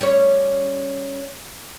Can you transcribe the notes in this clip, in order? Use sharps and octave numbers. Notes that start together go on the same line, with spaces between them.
G3 C#4 C#5